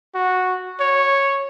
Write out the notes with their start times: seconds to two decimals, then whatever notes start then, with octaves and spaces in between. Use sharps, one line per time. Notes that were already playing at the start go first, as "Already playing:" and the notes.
0.15 F#4
0.80 C#5